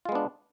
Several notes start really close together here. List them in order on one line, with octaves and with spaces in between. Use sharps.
F4 G#3 B3 D4